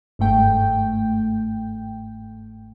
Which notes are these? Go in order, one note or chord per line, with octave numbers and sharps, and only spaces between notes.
G1 G#2 A3 G5